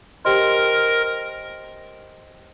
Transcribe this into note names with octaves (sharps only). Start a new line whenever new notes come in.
G4 A#4 C5 D#5 G5 C6